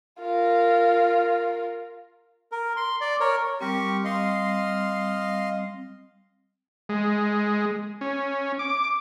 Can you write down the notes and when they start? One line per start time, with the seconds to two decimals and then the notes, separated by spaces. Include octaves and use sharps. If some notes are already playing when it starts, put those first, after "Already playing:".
0.20 F4 A#4
2.52 A#4
2.76 C6
3.01 D5
3.20 A#4 C#5
3.61 G3 C4 G4 A#4 C#6
4.04 D#5 F5 C6
6.89 G#3
8.01 C#4
8.59 D6